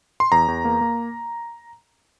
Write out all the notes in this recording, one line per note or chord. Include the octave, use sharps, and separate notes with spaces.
C6
E2 A#5
E2
A#3
A#3